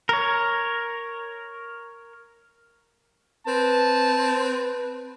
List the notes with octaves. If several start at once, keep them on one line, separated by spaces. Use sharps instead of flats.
A#4 C#5
C4 B4 A5